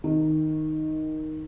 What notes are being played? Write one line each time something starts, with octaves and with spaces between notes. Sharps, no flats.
D#3